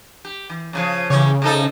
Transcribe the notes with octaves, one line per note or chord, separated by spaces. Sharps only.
G4
E3
F#2 C#3 F3
C#3 E3 G4 C#5
C3 D#4 A4